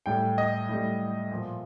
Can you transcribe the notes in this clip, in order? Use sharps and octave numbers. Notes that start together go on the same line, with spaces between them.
A2 G3 G5
D#5
A2 G3
A#2 F3